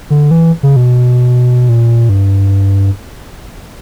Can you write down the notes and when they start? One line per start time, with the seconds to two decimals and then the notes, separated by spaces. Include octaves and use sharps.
0.10 D3
0.31 E3
0.63 C#3
0.76 B2
1.69 A#2
2.09 G2